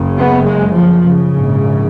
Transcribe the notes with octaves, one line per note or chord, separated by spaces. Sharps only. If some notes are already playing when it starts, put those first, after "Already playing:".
Already playing: F#1 F#2 C#3
B3
G#3
F3
C#3
A#1 G#2